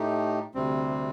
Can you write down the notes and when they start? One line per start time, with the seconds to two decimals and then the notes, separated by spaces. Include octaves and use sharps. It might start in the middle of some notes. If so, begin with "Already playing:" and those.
Already playing: A2 A3 D#4 G4
0.55 D2 C3 G3 C4